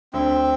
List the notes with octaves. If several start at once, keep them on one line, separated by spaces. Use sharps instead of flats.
D2 D3 C4